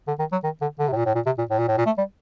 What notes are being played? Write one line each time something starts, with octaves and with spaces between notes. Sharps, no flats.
D3
D#3
F#3
D#3
D3
D3
C3
A2
A#2
A2
A#2
C3
A#2
A2
A#2
A2
A#2
A3
G3